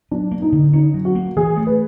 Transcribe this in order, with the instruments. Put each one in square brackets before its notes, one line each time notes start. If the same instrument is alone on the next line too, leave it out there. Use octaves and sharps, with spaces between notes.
[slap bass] F#3 [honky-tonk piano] D4
[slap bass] A#3
[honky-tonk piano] D#4
[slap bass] D3
[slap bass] C#4 [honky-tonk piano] D#4
[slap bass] F#3
[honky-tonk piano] F#4
[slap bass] A#3
[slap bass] E3 [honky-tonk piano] G#4
[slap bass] A3
[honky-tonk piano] B4